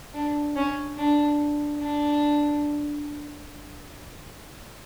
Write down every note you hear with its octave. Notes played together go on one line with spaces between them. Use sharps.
D4
C#4
D4
D4